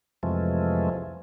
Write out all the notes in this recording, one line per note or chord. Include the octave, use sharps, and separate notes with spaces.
F2 C3 E3 F3 G#3 A3